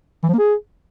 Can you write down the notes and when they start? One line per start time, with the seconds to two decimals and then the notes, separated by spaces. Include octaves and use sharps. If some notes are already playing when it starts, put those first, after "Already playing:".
0.24 E3
0.29 F3
0.34 A#3
0.39 G#4